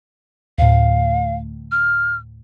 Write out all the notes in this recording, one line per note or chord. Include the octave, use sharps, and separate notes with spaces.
D2 A2 F5
F6